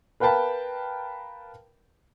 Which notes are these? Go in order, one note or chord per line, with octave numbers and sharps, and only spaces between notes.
A#4 B4 F5 G5 A5 B5